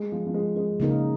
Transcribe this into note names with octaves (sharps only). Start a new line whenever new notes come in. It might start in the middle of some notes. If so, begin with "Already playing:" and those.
Already playing: G#3
F3
F3
G#3
G#3
C#3 A#3 D#4 A#4